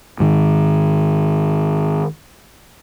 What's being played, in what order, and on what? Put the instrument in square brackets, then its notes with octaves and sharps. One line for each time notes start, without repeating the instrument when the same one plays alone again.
[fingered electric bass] G#2 D#3